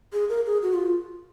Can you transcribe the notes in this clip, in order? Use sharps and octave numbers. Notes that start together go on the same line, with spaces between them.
G#4
A#4
G#4
F#4
F4